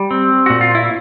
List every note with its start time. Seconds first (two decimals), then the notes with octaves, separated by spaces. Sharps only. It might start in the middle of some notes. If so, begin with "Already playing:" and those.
Already playing: G3
0.11 C4
0.46 A#2 F#4
0.61 F4
0.75 E4